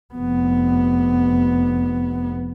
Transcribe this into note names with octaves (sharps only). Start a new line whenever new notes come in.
F1 B3